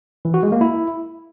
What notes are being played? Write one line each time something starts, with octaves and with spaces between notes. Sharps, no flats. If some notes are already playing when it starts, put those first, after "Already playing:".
E3
F#4
G#3
A#3
E4